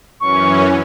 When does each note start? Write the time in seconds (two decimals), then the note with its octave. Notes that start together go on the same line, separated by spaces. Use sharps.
0.20 F#2 E3 C#4 C#6